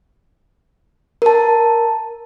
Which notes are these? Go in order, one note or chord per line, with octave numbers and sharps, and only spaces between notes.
A#4 A5